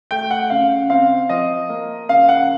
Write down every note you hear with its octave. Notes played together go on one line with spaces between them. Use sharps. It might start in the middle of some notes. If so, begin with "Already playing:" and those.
A3 G5
F#5
C#3 F5
C4 F5
F3 D#5
A#3
C#3 F5
F#5